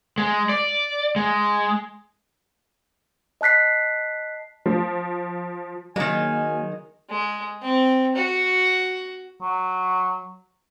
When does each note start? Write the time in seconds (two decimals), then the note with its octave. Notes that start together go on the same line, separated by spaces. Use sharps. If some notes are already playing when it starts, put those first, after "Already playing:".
0.18 G#3
0.49 D5
1.16 G#3
3.41 D#5 A5 F#6 B6 C7
4.66 F3
5.96 D#3 F#3 G#3 A#3 G#5
7.10 G#3
7.62 C4
8.16 F#4
9.42 F#3